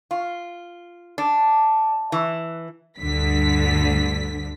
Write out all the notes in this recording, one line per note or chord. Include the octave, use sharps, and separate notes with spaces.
F4
D4
E3
D2 G2 D3 B6